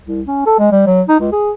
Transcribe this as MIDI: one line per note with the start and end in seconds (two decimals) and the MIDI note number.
0.06 0.22 36
0.27 0.42 61
0.46 0.55 69
0.59 0.69 56
0.72 0.82 55
0.87 1.02 54
1.08 1.17 63
1.20 1.31 37
1.32 1.52 68